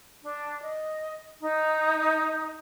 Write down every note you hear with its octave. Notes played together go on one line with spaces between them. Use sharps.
D4
D#5
D#4